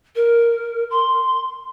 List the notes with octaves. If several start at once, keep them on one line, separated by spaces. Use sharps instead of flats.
A#4
C6